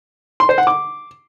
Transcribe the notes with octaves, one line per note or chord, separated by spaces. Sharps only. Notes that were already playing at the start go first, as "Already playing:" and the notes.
C6
C5
F#5
D6